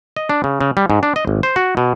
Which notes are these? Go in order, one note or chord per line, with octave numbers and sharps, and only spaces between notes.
D#5
D4
C#3
C#3
G3
G#2
D4
D#5
G#1
C5
F#4
B2